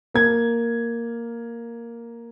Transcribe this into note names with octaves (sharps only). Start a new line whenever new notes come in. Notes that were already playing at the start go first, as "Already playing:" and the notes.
A#3 G#6